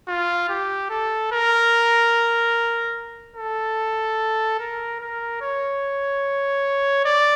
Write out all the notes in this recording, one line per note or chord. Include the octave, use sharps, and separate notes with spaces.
F4
G4
A4
A#4
A4
A#4
A#4
C#5
D5